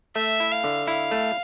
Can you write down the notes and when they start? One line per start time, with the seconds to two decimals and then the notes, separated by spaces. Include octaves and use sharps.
0.15 A3 E5
0.40 E4
0.52 F5
0.64 D3
0.88 E4 F5
1.11 A3